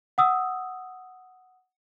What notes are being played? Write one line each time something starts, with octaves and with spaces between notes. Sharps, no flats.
F#5 D#6 E6